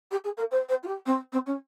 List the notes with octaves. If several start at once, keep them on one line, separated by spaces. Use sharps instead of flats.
G4
G#4
A#4
C5
C5
F4
G4
C4
C4
C#4